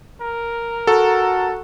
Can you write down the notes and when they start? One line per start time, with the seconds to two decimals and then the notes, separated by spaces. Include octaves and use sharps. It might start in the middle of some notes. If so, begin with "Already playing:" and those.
0.21 A#4
0.87 F#4 A4